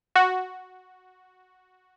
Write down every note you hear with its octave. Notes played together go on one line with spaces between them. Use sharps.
F#4